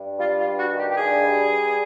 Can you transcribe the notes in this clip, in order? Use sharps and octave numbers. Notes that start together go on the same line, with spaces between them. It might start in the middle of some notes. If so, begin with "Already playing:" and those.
Already playing: G2
G3 F4
F4
G2
F#4
D#3
G4
G4
G2 G#4
G3
G2